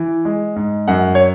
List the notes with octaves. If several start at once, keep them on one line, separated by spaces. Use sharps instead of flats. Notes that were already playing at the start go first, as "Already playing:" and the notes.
Already playing: E3
G#3
G#2
F#2 F#5
C#5